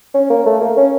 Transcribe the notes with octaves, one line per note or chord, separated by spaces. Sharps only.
C#4
A#3
A3
A#3
C#4